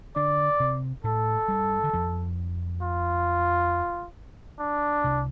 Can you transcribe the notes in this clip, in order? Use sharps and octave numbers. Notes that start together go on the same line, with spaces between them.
D3 D4 D5
C3 C4
A2 A3 A4
G2 G3
D3
F2 F3
F4
D4
C2 C3